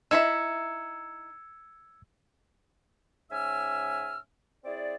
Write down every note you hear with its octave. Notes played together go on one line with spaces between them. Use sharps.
D#4 E4 E5 E6 G#6 C#7
G#2 C#4 E5 G#5 E6 F6
C4 E4 G#4 D5